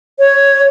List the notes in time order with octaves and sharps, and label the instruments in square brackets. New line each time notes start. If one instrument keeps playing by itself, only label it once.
[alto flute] C#5